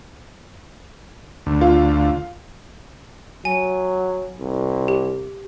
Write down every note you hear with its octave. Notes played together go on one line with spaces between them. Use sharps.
D2
F4
F#3 G#5
C2
G4